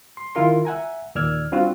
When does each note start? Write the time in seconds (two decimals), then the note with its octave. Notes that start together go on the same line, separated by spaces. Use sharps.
0.17 C6
0.35 D#3 E4 F4 A#4 C6
0.65 E5 F#5 G#5 A#5
1.15 D#2 A#2 D5 E6 F6 G#6
1.52 G3 C4 D4 F4 F#4